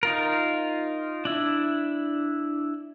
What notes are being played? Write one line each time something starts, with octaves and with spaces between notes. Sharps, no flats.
D#4 F4 A#4
D4 E4